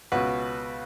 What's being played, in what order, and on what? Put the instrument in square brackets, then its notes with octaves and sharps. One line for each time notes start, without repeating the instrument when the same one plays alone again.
[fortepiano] C#2 B2 F#4 B4